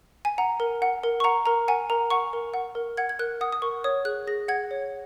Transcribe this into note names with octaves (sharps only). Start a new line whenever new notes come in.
G#5
F#5 A#5
A#4
F#5
A#4
C#6
F#5 A#5
A#4 A#5
F#5 G#5
A#4 A#5
F#5 C#6
A#4
F#5
A#4
F#5 G#6
G#6
A#4 F#6
F#5 D#6
D#6
A#4 C#6
C#5 D#6
G#4 F#6
G#4 A#6
F#5 G#6
C#5